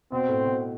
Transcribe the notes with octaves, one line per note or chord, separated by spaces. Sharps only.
B2 C4
A2
B2